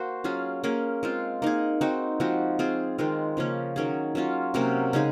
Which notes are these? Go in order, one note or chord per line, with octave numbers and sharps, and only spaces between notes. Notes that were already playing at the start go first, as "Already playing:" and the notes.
Already playing: A#3 F#4 C5
F#3 C#4 F4 G#4
A#3 C#4 G#4
G#3 C4 F4
A#3 D#4 G#4
C4 D#4 F#4
F3 G#3 C4 F#4
C4 F4 G#4
D#3 G#3 C4 F4
C#3 F3 A#3 C#4
D#3 F#3 C#4 G#4
F#3 C#4 F4
C3 F#3 A#3 C#4
C#3 G#3 D#4 G#4